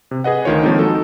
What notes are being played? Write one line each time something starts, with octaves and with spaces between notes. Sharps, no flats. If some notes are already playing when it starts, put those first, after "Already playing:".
C3
G#4 B4 D#5 F#5
D2 D#3 F4 C#5
D#3 F3 G#3 A#3 C4 D#4
D#4 F#4 A4